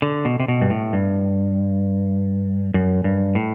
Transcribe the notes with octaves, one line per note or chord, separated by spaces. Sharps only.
D3
B2
C3
B2
G2
A2
G2
F#2
G2
A2